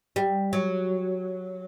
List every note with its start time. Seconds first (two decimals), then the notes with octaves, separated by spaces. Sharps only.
0.16 G3
0.53 F#3